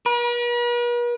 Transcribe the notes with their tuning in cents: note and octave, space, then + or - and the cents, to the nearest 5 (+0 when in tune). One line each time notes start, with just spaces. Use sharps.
B4 -45